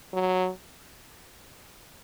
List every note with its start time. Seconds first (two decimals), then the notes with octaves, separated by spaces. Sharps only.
0.13 F#3